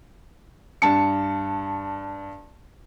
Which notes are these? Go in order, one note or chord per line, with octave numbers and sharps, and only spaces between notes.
G2 A5 C#7